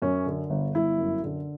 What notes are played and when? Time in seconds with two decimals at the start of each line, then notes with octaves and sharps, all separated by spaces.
0.02 F#2 C#4
0.26 D3
0.50 G1
0.75 G1 E4
0.98 F#2
1.24 D3